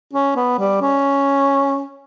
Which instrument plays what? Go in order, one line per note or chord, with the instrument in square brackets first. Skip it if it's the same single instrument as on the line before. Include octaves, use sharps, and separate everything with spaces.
[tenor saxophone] C#4
B3
G3
C#4